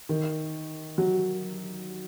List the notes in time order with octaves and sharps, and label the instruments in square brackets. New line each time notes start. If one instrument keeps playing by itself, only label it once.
[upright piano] D#3
F#3